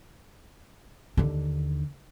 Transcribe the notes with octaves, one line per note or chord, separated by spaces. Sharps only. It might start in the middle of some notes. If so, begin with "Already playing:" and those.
D#2 D3